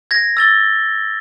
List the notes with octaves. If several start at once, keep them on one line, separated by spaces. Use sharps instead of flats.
G#6 A#6
E6 A6 G7